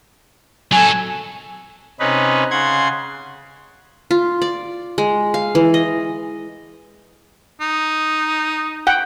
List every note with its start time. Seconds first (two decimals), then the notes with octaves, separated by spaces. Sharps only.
0.72 F#3 A4 G#5
2.00 C3 C#4 D#4 B4
2.51 C#3 F#5 C6 G#6
4.11 F4
4.42 D5
4.98 G#3
5.34 F5
5.55 E3
5.74 D#5
7.61 D#4
8.87 F#5 G5